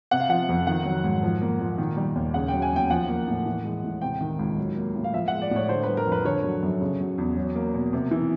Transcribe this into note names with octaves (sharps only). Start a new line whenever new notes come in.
C3 F#5
F5
F3 F#5
F2
D#3 F#5
F#3
G#2
F3
A#3
A#2
D#3
G3
D#2
C#3 F#5
G5
F#3
G#5
E2 G5
F3 F#5
A#3
A2
E3
G#3
A2
C3 G5
D#3
C#2
F#3
A#3
A2
F5
F3 E5
G#3 F#5
D5
A2 C#5
D3 C5
G3 B4
A#4
F2
B4
D3 C#5
F#3
F#2
C#3
F#3
E2
F#3
A#3
B2
C3
E3